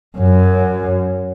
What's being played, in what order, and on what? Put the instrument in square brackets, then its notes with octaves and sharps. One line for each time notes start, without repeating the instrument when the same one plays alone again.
[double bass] F#2